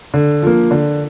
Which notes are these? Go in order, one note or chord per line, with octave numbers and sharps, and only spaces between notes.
D3
F3 A#3
D3